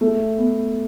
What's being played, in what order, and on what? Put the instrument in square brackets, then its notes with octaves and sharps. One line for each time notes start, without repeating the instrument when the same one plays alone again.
[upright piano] A3
B3